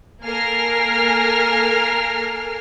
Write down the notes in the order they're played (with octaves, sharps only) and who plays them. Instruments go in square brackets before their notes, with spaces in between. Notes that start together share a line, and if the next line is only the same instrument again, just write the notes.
[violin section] A#3 A4 A#4 G#5 F6 C7